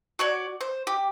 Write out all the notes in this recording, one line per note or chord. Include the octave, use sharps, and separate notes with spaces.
F#4 C#5 D5
C5
G4